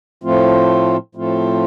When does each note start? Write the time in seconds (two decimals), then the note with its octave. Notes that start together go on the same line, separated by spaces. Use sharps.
0.24 A2 F3 A3 C4 F4
1.15 A2 F3 A3 C4 F4